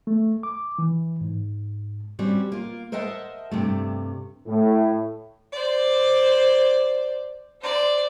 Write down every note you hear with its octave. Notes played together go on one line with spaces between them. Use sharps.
A3
D6
E3
G#2
G3 C4 C#4 F#4
A#3 F4
A#4 C5 D#5 E5 F#5 A5
G2 C3 A3
A2
C5 D5
C5 D5